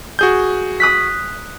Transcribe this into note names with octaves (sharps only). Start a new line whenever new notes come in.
F#4 G#4 G6
D#6 F#6 B6